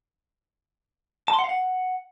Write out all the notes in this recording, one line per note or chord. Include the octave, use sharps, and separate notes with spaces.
A5
C6
F#5
F5
F#5